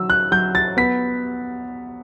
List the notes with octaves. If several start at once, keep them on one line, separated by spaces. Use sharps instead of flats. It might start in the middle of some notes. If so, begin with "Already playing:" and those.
Already playing: F#3 E6
F#6
F#3 G6
A6
B3 B6